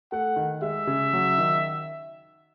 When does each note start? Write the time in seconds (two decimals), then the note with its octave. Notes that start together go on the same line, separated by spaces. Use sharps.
0.12 A3 F#5
0.36 D#3
0.62 G#3 E5
0.87 C#3
1.13 F#3
1.38 D#3